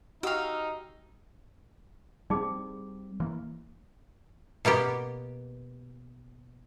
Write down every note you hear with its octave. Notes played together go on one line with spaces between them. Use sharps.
D#4 F#4 G4 D#5 F5 E6
G3 A3 C4 D#4 G#4 D6
E3 A#3
B2 A#3 B3 G4